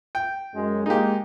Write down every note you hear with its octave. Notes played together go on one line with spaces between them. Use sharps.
G5
F#2 G#3
G#3 A#3 D#4 G4